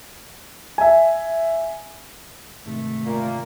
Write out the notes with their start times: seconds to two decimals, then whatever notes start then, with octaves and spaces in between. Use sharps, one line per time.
0.78 E5 G#5
2.66 G#2 C3 D#3 A3
3.06 A#2 A#3